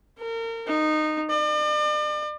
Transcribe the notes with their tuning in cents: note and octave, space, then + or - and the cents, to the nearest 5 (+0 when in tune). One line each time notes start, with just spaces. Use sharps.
A#4 -30
D#4 -15
D5 +40